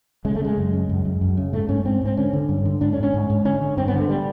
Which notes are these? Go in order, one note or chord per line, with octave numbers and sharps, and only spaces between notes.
C#3 G#3
A3
C#3 G#3
F#2
C#3
F#2
F#2
F#2
C#3
G#2 A3
G#2 C#4
G#2 C4
G#2 C4
D3 C#4
D3
G2
D3
G#2 D4
C#4
G#2
C#4
G#2
G#2
D3 C#4
D3
G2 C4
B3
D3 A3
G3